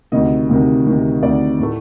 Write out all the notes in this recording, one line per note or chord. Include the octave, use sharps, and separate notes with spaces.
D2 C3 D#3 D#5
D2 C3 D#3
D2 C3 D#3
D2 C3 D#3 D5
A2 A3